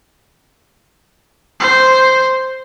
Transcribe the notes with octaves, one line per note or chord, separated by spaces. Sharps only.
C5